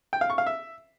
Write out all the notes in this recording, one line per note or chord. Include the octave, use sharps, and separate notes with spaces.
G5
F5
C#6
F5
E5